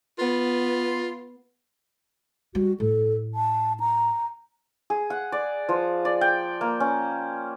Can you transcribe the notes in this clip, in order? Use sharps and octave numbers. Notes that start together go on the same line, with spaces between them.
B3 F4
G3 F#4
A2 A4
A5
A#5
G#4
F#5
D5
F3
D5
G5
A#3
C#4